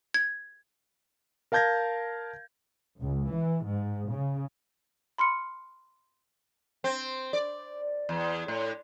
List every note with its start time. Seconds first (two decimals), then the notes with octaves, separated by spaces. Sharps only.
0.14 G#6
1.52 A#4 F5 A5 G6 G#6 A#6
3.01 C#2
3.30 E3
3.67 G#2
4.12 C#3
5.18 B5 C6 F6 C#7
6.84 C4
7.33 D5
8.09 E2
8.48 A2